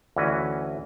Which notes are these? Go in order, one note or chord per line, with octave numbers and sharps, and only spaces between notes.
D2 E3 C#4 F#4 B4 G#5